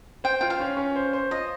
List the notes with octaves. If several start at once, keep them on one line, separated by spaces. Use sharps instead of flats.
C5 G5
F4 G5
F5
C#4
C#4
C5
C5
F4 D#5